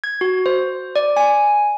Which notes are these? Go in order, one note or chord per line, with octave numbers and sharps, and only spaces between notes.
G#6
F#4
C5
D5
G#5